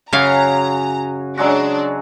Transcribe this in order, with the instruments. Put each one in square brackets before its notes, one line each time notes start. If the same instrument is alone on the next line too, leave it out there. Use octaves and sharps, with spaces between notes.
[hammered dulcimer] F#2 F#4 G#5 [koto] C#3 F5 [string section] A#5
[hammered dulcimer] F#3 G#3 F#4 [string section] D4